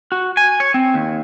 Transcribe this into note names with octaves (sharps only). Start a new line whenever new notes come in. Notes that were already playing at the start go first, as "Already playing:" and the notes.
F#4
G#5
C#5
C4
D#2